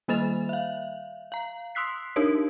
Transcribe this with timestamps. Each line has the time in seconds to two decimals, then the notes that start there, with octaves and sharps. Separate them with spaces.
0.08 D#3 G3 A#3 D#5 A6 F7
0.49 E5 F5
1.32 F5 A#5
1.75 C6 D#6 E6 F#6 B6 C7
2.16 D4 D#4 G4 A#4 C#5